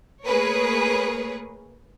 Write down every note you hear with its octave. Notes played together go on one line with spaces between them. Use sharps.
A3 A#3 G#4 A#4 B4 C#5